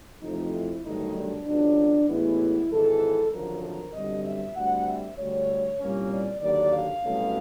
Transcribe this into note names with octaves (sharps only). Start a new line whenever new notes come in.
F2 C3 E3 A3 D#4
E4
G1 G2 D#3 F#3 A3 D#4
D4
C#2 B2 F#3 D4
A1 A2 E3 G#3 B3 E4
G#1 G#2 E3 G#3 A4
G#1 F#2 D3 F3 A#4
A#4
G1 F#2 D3 G3 C4 D#5
E5
D2 D3 G3 C4 F#5
E5
D2 D3 G3 C#5
C2 A#2 G3 A#3 C#4
D5
D#2 D3 F#3 D5
F5
C2 B2 F#3 A3 C#4